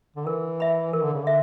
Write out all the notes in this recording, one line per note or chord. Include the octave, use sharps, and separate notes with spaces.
D3
E3 A#4
E5 B5
E3 A#4
D3
C#3
D3 E5